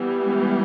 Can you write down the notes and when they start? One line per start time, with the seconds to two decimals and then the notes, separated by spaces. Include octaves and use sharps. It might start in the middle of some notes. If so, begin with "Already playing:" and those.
Already playing: E3 G3 B3
0.22 G#3